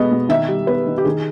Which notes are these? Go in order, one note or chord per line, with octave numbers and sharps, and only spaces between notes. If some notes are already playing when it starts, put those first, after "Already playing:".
Already playing: B2 G#3 B3 D#5
B2
D#3 E5
G3
B3 B4
D#3
G4
D#3 G#4